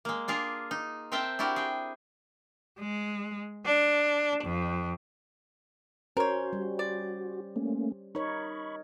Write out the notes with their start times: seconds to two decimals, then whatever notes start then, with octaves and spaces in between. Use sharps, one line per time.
0.05 G#3 A#3
0.28 D4 F4 G#4 A#4
0.71 D#4
1.12 C4 A#4 C5 E5 G5 A5
1.39 D4 E4 F#4 G4 A#4
1.56 G#4 G5
2.80 G#3
3.66 D4
4.44 F2
6.17 C#4 F#4 A#4 C5 C#5
6.53 G3
6.79 D5
7.56 A3 A#3 C#4
8.15 D#4 A#4 C#5 B5 C#6